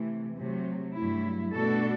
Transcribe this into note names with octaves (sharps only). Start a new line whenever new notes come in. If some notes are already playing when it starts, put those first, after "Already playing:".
Already playing: C3 E3 A3
C3 F#3 A3
G2 F#3 A3 E4
B2 A3 D4 F#4 A4